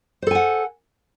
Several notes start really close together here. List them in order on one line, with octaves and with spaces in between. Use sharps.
C5 A4 G#5 F#5